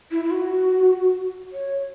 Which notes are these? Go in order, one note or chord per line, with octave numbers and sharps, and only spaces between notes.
E4
E4
F#4
C#5